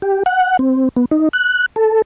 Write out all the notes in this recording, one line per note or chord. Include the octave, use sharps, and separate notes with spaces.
G4
F#5
C4
B3
D#4
F#6
A4